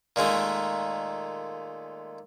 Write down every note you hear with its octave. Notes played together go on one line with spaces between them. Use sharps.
A#2 D#3 G#3 A3